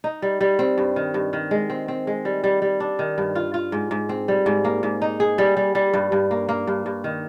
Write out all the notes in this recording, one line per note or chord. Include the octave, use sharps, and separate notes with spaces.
D#4
G3
G3
C4
G2
D#3
G2
D#3
G#3
C4
C4
G#3
G3
G3
G3
D4
D#3
G2
F4
F4
G#2
G#2
C4
G3
G#2
A#3
G#2
D#4
G#4
G3
G3
G3
G2
G2
A#3
A#3
G2
G2
D#3